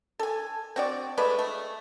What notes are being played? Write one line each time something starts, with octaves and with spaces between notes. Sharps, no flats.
A4 G#5
C4 F#4 D5
G#3 A3 B4 D5
A3